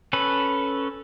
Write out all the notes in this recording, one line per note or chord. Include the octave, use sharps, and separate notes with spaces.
C#4 A4 B4